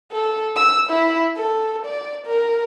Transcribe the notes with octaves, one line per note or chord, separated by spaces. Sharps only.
A4
E6
E4
A4
D5
A#4